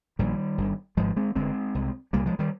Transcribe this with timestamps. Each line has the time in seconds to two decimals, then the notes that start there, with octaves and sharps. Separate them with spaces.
0.19 A#1 A#2 D#3 G3
0.58 G1 G2 D3
0.96 G#1 G#2 F3 G#3
1.16 G#3 C4
1.35 G1 G2 D3 G#3 C4
1.75 C2 C3
2.13 C2 A#2 G3 A#3
2.26 F3 G#3
2.39 D#3 G3